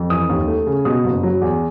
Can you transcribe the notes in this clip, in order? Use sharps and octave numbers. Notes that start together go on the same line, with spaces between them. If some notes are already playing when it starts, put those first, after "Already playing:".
Already playing: F2
E3 D#6
D#2
A3
C#3
B2 D#6
F#1
F#3
E2